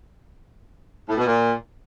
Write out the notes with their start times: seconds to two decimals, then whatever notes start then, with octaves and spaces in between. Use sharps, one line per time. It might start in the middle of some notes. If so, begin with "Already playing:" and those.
1.08 A2
1.16 B2
1.25 A#2